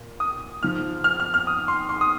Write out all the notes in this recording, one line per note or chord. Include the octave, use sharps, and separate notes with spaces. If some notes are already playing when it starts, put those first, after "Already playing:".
Already playing: A#2
D#6
G#2 F3 F6
F6
F6
F6
D#6
C6
C6
D#6